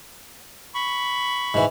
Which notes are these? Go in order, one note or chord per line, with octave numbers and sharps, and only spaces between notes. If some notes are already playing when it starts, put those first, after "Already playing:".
B5 C#6
G#2 E3